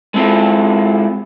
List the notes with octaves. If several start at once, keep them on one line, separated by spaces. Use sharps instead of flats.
G#3 C4 E4 F4 A4